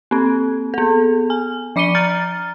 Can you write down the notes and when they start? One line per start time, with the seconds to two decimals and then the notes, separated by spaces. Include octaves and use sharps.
0.11 A#3 C4
0.74 B3 A4
1.30 G#5
1.76 F3 D5 D6 C#7 D#7 G7
1.95 A#5 F6 A6